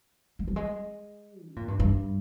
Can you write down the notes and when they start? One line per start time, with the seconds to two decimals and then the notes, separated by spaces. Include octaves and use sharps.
0.39 G#3
0.48 G3
0.56 G#3
1.45 C#3
1.56 A#2
1.68 G2
1.80 G2